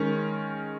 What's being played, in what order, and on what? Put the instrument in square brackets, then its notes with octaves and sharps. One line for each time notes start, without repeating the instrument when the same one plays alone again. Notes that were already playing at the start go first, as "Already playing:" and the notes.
Already playing: [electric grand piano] D#3 G#3 C#4 A#4